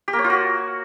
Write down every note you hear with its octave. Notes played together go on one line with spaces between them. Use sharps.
G4
A#3
C#5
F4
F#4